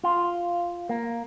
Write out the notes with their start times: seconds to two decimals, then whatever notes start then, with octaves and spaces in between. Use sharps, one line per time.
0.04 F4
0.89 A#3